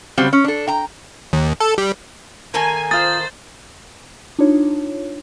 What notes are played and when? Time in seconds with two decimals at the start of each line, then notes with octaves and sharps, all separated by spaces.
0.18 C#3 F#3 G3 C4
0.33 C#4
0.44 D4 A4
0.68 G5 A#5
1.33 D#2
1.60 A4
1.78 G3
2.54 D#3 A#3 A4 G#5
2.91 F4 C5 D#6 A6
4.39 D4 D#4 F4 C#5